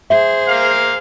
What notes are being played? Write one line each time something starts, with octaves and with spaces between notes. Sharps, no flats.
G#4 C5 E5
A#3 F5